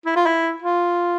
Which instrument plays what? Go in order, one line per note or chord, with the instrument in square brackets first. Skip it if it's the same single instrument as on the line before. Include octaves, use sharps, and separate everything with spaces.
[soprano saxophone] E4
F4
E4
F4